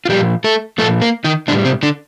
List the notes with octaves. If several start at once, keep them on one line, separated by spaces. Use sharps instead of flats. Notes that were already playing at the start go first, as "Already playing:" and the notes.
F4
A#2 F3 G3 G4
A3 A4
A#2 F3 A3 A4
A#3 A#4
D#3 D#4
A2 D3 G3 D4
C3 C4
D3 D4